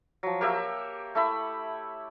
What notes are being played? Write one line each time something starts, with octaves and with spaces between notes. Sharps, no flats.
F3 F#3
A#3 G4 C#5 E5
A3 E4 B5